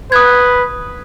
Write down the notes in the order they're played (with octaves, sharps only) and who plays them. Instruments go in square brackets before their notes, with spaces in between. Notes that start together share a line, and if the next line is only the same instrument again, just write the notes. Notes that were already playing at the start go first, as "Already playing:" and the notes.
[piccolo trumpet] B4 [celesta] D#6 F#6 G#6